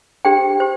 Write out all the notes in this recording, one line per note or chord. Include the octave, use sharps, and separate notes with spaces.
D4 G4 C5 G5
G4 C5